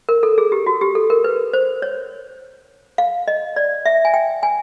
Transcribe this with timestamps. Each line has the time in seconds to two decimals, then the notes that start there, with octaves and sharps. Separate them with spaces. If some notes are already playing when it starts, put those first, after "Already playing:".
0.09 A#4
0.23 A4
0.38 G#4
0.52 G4
0.66 F#4
0.81 G4
0.95 A4
1.10 A#4
1.24 B4
1.53 C5
1.82 C#5
2.98 F5
3.28 D#5
3.56 D5
3.86 E5
4.05 G#5
4.14 G5
4.43 G#5